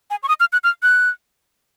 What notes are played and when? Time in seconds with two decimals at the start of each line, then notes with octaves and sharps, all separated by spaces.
0.11 G#5
0.23 C#6
0.29 D#6
0.40 F6
0.53 F#6
0.64 F6
0.83 F#6